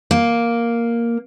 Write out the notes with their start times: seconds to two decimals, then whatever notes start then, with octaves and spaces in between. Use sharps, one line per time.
0.11 A#3